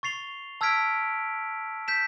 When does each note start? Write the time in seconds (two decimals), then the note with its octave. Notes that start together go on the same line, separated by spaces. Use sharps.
0.03 C#6 A6 C7 F7 G7
0.61 A5 E6 F6 G#6 B6 D7
1.88 G6 B6 E7